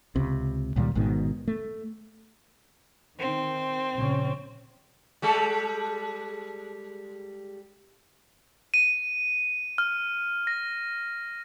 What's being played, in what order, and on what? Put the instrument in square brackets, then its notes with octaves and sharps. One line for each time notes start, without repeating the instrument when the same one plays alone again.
[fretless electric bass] C#2 C3
C#2 A#2 D#3 G3
G#1 G#2 B2 D#3
A3
[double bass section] D#3 [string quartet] C4
[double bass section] A#1 C#3 C#4
[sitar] G3 G#3 A4
[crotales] D#7
F6
A#6